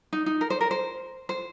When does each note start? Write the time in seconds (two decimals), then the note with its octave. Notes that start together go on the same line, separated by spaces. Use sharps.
0.13 D#4
0.26 D#4
0.41 A#4
0.50 C5
0.61 A#4
0.71 C5
1.29 C5